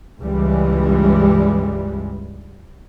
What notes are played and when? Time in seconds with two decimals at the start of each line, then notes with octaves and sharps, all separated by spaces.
0.20 C#2 G2 E3 G3 G#3